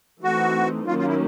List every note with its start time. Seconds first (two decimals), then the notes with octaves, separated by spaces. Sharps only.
0.24 E3 A3 C4 D#4 F#4
0.87 D#3 F#3 A#3 C#4 F4
0.98 F4
1.08 E4